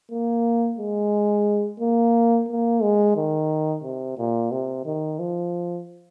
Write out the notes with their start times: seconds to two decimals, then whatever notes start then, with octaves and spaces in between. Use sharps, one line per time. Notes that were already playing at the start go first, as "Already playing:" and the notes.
0.11 A#3
0.79 G#3
1.80 A#3
2.49 A#3
2.82 G#3
3.16 D#3
3.84 C3
4.18 A#2
4.51 C3
4.86 D#3
5.19 F3